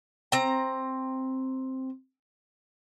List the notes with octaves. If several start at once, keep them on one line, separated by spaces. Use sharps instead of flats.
C4 A#5